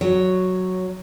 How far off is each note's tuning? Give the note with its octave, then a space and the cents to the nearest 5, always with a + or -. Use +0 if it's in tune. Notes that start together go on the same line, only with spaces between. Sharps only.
F#3 +0 C#5 +0